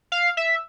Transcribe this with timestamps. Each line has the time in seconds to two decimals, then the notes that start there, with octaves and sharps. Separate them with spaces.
0.12 F5
0.37 E5